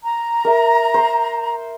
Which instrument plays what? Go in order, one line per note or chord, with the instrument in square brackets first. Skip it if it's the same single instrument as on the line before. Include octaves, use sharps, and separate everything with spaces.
[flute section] A#5
[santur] A#4 E5
C5